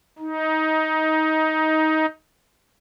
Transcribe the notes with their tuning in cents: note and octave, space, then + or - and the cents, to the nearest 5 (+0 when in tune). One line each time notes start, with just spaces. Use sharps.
D#4 +15